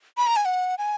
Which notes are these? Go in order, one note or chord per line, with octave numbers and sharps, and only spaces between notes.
B5
A#5
G#5
F#5
G#5